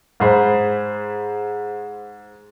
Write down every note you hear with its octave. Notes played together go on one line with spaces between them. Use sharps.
G#2 G#4 C5 B5